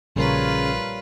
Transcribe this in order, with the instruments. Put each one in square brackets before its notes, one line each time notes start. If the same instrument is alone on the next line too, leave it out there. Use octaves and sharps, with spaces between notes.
[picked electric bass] A#1 [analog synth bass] C#3 [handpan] G3 A#4 C#5 [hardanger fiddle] F4 B4